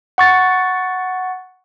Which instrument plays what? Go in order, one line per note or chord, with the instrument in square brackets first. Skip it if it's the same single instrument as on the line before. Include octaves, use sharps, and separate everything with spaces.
[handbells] F#5 C#6 A6